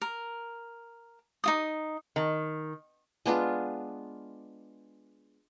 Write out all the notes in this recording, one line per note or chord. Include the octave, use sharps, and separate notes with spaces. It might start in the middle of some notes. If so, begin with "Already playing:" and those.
A#4
D#4 F4 D#6
D#3
G#3 B3 D4 F4